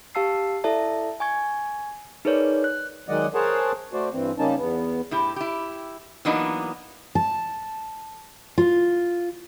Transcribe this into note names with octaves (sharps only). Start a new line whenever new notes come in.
G4 F5 A5 E6 C7
E4 A4 D5 E5 A5
G#5 C#6 G#6
D#4 G#4 A#4 B4 C#5 D5
F#6
D#3 F#3 G#3 D5 D#5 F#5
G#4 A#4 C5 C#5 F#5 A5
A3 F#4 C5 D5
G2 E3 C4
C#3 G3 A#3 C#4 D#4 A5
E2 B3
A2 E4 G4
E4 G4
E3 F#3 A#3 B3 D4 D#4
A5
F4